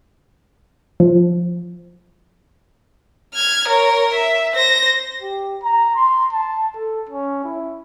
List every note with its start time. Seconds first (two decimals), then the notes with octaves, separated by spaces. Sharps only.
1.00 F3
3.34 F6 G#6
3.68 A#4 C#5
4.13 E5
4.53 C5 A#6
5.22 G4
5.63 A#5
5.96 C6
6.33 A5
6.75 A4
7.09 C#4
7.44 E4